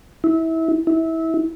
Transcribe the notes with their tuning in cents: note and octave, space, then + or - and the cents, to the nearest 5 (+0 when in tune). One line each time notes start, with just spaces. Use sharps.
E4 -25
E4 -25